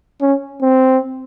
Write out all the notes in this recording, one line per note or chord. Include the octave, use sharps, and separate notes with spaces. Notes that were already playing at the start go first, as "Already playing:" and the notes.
C#4
C4